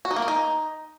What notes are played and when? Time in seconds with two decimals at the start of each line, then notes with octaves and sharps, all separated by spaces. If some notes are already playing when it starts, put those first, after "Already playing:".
0.05 F#4
0.11 D#4
0.16 A#3
0.22 A#4
0.28 D#4